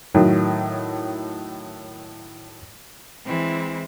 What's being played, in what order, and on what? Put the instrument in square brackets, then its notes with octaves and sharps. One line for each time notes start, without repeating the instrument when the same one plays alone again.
[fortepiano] A2 D#3 F#3
[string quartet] E3 G#3 C4 E4